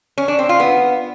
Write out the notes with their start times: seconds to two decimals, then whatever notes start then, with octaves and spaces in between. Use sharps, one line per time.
0.18 C#4
0.28 D4
0.39 C4
0.49 F4
0.60 B3